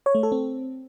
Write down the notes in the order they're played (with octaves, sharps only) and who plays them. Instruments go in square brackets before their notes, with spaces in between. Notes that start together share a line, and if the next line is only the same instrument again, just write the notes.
[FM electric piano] C#5
A3
A4
C4